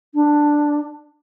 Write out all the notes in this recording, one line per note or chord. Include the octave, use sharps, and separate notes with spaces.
D4